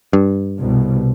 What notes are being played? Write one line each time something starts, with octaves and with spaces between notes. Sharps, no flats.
G2
C2 B2